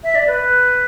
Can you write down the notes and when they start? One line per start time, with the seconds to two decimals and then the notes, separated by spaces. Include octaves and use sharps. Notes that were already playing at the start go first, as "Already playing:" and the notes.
0.04 E5
0.15 D5
0.27 B4